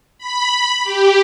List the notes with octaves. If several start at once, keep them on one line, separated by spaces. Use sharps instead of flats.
B5
G4